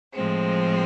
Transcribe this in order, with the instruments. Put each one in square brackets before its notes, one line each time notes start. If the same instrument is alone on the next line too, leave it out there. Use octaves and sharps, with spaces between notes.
[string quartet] A2 F3 G#3 C4